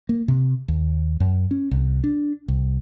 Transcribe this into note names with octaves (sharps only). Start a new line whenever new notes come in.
A#3
C3
D#2
F#2
C#4
C2
D4
C2